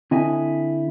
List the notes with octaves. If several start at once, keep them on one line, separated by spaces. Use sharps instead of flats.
D3 C4 E4 D#5 G#5